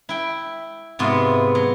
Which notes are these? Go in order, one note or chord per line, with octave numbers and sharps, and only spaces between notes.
E4 G5
G#2 C3 B3 F4
F#3